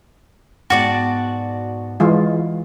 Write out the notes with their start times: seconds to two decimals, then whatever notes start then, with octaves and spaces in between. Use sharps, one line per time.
0.70 G#2 B2 F#4 D5 A5
2.00 E3 G#3 F4